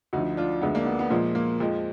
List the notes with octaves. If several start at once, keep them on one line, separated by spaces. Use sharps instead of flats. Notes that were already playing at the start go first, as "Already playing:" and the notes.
D2 D3 F3 D#4 F#4
D4 F4
D2 D3 G#3 B3
A#3 D4
B3
B3
A#2 F3 G#3 A#3
A#3
F2 F3 G#3